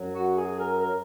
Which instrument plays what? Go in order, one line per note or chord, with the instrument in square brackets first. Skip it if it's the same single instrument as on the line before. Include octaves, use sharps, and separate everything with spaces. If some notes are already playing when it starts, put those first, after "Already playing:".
Already playing: [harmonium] F#2 F#3
[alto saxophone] F#4
G#4
A#4
A#4